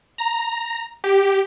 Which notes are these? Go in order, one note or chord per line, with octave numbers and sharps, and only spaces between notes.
A#5
G4